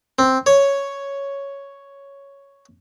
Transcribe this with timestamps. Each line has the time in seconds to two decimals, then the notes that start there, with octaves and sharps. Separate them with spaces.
0.19 C4
0.46 C#5